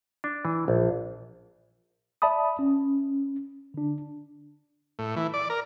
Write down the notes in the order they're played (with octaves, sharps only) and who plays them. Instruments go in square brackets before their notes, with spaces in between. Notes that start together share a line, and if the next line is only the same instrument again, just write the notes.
[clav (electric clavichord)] D4
E3
A#1
[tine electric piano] D5 E5 A5 B5 D#6
C#4
D3 D4
[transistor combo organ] A2
E3
D5
A#4